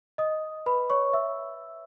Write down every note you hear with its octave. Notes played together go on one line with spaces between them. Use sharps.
D#5 D#6
B4 B5
C#5 C#6
E5 E6